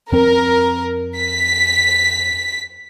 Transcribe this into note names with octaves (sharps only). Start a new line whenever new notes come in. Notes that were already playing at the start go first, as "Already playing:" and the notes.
F2 C4 A#4
B6